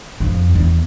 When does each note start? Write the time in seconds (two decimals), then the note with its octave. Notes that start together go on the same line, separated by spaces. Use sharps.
0.20 F2
0.55 E2